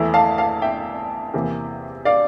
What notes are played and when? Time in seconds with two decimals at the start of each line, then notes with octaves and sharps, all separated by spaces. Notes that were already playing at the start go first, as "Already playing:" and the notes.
Already playing: E2 E3 A3 E4
0.14 F5 A5
0.38 F5 A5
0.62 E5 G5
1.34 E2 C3 E3 A#3
2.05 D5 F5